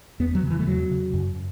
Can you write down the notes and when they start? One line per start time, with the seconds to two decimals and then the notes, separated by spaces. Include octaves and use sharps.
0.20 E2 B3
0.35 F#3
0.43 C#3
0.50 E3
0.59 A3
0.67 E2 F#3
0.91 C#3
1.14 F#2